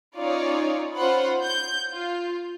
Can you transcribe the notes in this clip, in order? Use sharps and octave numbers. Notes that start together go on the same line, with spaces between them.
C#4 D#4 F4 C#5 D5
C#4 F4 C5 F#5 B5
G6
F4